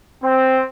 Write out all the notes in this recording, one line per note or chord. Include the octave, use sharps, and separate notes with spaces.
C4